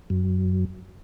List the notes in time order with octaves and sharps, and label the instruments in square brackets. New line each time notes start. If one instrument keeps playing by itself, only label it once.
[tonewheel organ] F#2